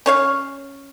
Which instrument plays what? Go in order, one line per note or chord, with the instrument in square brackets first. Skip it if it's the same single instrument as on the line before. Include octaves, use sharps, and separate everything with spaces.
[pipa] C#4 C#5 F5